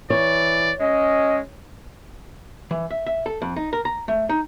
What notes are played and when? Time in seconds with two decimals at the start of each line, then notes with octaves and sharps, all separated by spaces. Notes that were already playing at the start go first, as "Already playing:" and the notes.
0.10 E3 C#5 D5
0.81 G#3 C#4 D#5
2.71 E3
2.90 E5
3.06 E5
3.26 A4
3.42 F2
3.56 D#4
3.73 A#4
3.85 A#5
4.08 A3
4.29 D#4